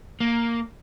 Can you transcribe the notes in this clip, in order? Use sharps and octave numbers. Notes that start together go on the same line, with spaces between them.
A#3